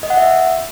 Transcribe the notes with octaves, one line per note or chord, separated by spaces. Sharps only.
D#5
F#5
E5